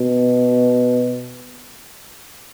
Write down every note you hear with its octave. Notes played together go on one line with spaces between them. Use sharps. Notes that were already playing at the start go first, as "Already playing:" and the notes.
Already playing: B2